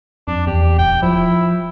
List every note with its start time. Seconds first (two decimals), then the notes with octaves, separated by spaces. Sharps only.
0.28 F2 D4
0.47 E2 G4
0.78 D1 G5
1.02 F3 E4